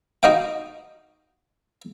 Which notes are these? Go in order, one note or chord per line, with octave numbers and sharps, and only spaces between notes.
D#4 F#4 D#5 F5 G5